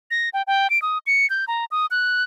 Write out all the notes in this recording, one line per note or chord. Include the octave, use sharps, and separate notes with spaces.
A#6
G5
G5
D7
D#6
C#7
G6
A#5
D#6
F#6